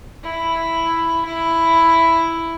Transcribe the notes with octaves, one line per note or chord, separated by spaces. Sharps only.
E4
E4